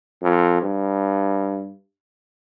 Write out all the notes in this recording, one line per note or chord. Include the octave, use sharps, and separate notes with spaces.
F2
G2